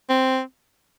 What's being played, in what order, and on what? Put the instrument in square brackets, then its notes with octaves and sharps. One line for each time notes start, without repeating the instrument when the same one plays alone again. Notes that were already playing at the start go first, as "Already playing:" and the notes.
[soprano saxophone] C4